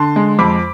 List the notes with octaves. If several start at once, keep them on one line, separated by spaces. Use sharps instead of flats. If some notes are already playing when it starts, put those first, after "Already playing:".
Already playing: D3 A5 C6
G#3
F2 B5 D6